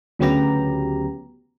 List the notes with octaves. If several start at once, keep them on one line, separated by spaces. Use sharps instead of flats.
D2 C#3 F#3 B3 G4 A#5